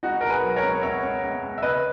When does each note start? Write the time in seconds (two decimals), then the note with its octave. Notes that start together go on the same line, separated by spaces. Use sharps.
0.03 C#2 D#4 F#4
0.21 B2 A#4
0.30 G#4 B4
0.43 F#3
0.56 A#4 C#5
0.63 C#2
0.83 C#2 C#5 E5
1.03 C#2
1.23 C#2
1.43 C#2
1.58 E5
1.62 C#3 B4 D#5